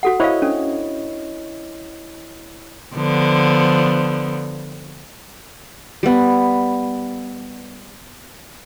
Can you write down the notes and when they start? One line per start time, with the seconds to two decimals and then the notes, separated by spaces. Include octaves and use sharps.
0.03 F#4 A4 F#5
0.20 E4 C5 C#5 D#5 F5
0.42 C#4 D4 A4
2.95 D3 F3 B3
6.03 G3 B3